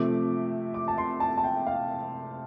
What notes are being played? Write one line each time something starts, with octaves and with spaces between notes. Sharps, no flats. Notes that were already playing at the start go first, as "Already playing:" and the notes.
Already playing: C3 F3 A3 D6
D6
A5
C6
A5
A5
G5
F5